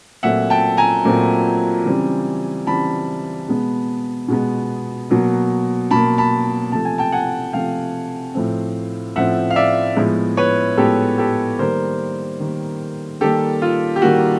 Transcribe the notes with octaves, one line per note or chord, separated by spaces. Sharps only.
A#2 F#3 A3 C4 E5 F#5
G5 A5
G#5 A#5
A#2 F#3 A3 C4
C#3 E3 G3 C4
C#3 E3 G3 C4 A5 B5
B2 G#3 B3
B2 G#3 B3
B2 F#3 A#3
B2 F#3 A#3 A5 B5
A5 B5
C3 F3 A3 A5
G#5
G5 A5
F#5 G#5
C3 F3 A3 F5 G5
A2 F3 A3 C4
A2 F3 A3 C4 E5 F#5
F5
D5 E5
A2 F3 G#3 B3
B4 C#5
A2 F3 G#3 B3 G4 A4
G4 A4
D#3 G3 A#3 A#4 C5
D#3 G3 A#3
D#3 G3 A#3 G4 A4
F4
G4
D#3 G3 A#3 F#4